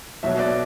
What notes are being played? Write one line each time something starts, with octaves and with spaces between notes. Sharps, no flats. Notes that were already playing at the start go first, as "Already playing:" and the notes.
B1 B2 F#3 E5
D5